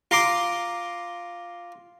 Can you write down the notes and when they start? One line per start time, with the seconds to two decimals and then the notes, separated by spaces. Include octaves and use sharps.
0.11 F4 A#5 C6 D6